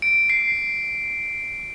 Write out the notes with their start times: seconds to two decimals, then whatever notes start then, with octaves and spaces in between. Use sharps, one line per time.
0.02 D7
0.30 C7